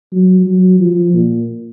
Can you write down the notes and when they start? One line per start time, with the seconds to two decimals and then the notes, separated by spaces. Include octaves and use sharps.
0.13 F#3
0.46 F#3
0.80 F3
1.14 A#2